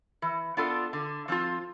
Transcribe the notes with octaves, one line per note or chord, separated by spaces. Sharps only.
E3
B3 D4 F4 A4
D3
F3 C4 F4